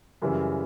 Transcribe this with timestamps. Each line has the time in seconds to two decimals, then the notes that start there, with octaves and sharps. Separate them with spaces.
0.22 F#2 C#3 E3 G3